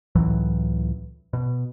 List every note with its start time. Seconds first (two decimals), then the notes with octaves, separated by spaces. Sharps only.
0.15 C#2 A2 E3 F#3
1.33 B2